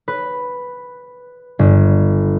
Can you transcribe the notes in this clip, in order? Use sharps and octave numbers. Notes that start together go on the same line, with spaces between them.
B4
G1